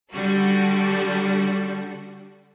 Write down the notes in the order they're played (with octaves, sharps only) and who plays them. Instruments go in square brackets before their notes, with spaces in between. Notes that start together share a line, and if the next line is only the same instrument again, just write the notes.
[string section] D3 G3 F#4 A4